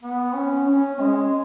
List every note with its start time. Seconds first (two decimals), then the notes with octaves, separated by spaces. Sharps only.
0.03 B3
0.35 C#4
0.68 C#4
1.00 G#3